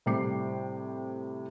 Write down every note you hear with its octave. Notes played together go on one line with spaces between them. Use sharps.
A2 C3 G3 G5 D6 C7